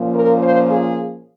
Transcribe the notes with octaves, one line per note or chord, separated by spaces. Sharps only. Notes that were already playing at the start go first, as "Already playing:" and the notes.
Already playing: A#2 F3 A#3 C#4
A#4
C5
G#4